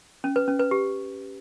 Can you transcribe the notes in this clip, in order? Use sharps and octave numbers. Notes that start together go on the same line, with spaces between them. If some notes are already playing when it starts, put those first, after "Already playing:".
C#4
B4
C#4
B4
G4